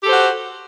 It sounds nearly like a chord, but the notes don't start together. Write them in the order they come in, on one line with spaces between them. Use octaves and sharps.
G4 A4 C5 F#4